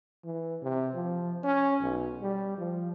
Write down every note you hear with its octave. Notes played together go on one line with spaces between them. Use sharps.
E3
C3
F3
C#4
B1
G3
F3